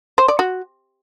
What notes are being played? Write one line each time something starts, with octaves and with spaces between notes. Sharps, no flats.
C5
D5
F#4